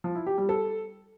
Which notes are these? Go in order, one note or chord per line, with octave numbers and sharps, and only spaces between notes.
F3
E4
G4
G3
A4